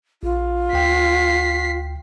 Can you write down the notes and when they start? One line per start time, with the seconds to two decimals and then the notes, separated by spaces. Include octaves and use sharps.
0.23 A#1 F4
0.73 D2 G5 B6 C7